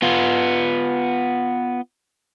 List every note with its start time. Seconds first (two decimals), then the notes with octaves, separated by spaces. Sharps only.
0.02 B3 F4